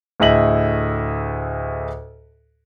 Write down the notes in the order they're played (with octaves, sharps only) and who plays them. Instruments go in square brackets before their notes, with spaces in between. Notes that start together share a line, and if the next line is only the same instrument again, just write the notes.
[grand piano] D2 A2 G#4 D#5 E5 F#7